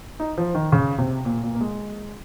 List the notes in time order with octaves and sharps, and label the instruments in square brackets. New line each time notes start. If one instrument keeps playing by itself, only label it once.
[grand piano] D#4
F3
D#3
C#3
C3
A#2
A#2
A#3
G#3